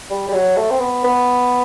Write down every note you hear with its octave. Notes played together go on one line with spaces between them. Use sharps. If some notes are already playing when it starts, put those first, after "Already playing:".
G3
G3
F#3
A3
C4
B3
B3